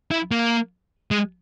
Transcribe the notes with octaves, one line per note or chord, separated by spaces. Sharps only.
E4
A#3
G#3